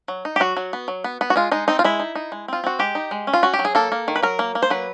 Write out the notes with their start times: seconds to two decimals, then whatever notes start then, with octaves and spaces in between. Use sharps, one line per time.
0.08 F#3
0.25 D#4
0.36 G4
0.40 F#3 F#4
0.56 F#3
0.73 B3
0.88 F#3
1.04 B3
1.21 B3
1.30 F#4
1.36 G#3 F4
1.51 G#3 D#4
1.68 C4 D#4
1.79 F4
1.84 G#3 E4
1.99 D#4
2.15 D#4
2.32 G#3
2.48 C4 F4
2.64 C4 F#4
2.79 G#3 G4
2.95 D#4
3.11 G#3
3.27 C#4
3.33 F4
3.43 C#4 F#4
3.53 G4
3.59 F#3
3.65 G#4
3.75 A#3 A4
3.92 A#3
4.08 D#3
4.16 B4
4.22 F#3 A#4
4.39 A#3
4.55 A#3
4.62 C5
4.70 F#3 B4